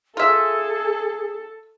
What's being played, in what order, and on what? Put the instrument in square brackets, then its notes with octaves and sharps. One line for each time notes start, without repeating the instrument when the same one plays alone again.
[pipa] F4 E5 [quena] G#4 [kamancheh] A4